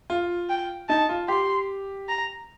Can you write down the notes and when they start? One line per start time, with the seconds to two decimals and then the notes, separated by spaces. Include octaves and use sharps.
0.10 F4
0.49 G5
0.89 D#4 A5
1.09 F4
1.28 G4 C6
2.09 A#5